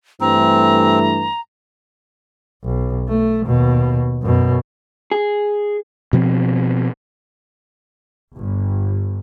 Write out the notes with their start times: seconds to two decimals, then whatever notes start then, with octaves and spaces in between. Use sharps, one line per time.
0.21 G2 E3 A3 C4 A#5
2.64 B1
3.08 A3
3.46 D#2 B2
4.22 F#2 B2
5.11 G#4
6.13 B2 F3 C4
8.33 G1